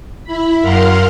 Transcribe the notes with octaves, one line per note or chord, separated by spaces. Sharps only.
E4 B5
F#2 A#4 F5 F#5 C6 F6